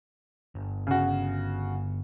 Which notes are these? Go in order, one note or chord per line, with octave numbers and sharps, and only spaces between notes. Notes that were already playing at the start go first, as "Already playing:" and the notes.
G1
C#3 F#4